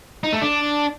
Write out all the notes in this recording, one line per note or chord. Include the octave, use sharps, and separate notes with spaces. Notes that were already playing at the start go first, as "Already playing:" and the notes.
D#4
A3
D4